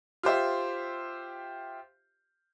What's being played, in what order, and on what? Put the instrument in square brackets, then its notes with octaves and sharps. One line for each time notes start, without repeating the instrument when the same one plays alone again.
[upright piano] F4 G4 C5 E5